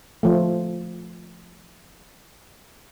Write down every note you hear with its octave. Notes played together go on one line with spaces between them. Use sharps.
F3 A3